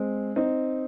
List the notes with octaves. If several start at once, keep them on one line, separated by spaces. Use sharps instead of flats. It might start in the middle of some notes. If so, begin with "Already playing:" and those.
Already playing: G#3 C4
C4 D#4